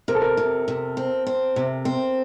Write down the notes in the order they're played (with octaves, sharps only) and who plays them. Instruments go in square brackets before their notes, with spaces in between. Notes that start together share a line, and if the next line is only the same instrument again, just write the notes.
[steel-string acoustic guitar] C3 [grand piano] A#4
[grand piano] A4
A#4
[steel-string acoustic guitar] C3
C3
C4
C4
C3
C4